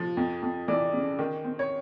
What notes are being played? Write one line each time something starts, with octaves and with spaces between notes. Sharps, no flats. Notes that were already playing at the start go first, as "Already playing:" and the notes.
Already playing: F3
F2
F2
E3 D5
C#3
D#3
C4
C#5